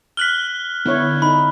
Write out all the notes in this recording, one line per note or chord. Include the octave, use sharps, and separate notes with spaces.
F6 F#6 B6 F#7 G7
D3 B3 E4 C#5
D#4 B5